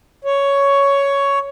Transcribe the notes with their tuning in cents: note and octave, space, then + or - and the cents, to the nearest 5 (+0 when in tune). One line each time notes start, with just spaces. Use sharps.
C#5 +10